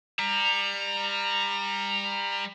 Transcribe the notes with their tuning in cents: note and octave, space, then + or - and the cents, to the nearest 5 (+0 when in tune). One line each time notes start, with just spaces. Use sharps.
G3 +25 A#5 +0